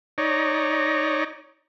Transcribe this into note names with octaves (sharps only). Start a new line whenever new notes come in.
D#4 C#5 D5 A#5